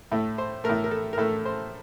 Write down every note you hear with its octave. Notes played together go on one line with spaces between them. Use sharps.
A2 A3
C5
A3 A#4
A2
A#4
A4
A#4
A2 A3 A4
C5